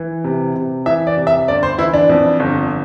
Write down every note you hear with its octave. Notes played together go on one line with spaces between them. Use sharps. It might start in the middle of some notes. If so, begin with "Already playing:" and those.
Already playing: E3
C3
C3
E3 E5
D5
C3
E5
G1 D5
C5
E3 E4
D4
F2
G1